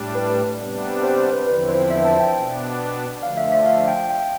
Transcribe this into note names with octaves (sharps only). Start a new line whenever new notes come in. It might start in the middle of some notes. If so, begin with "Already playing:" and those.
Already playing: A2 G3 D4
B4
C3 G3 B3 D4
C5
C5
B4
E2 D3 F3 C4 E4 B4
C5
E5
A5
G5
B2 B3 D4
D3 F3 A3 F5
E5
E5
F5
G5
G5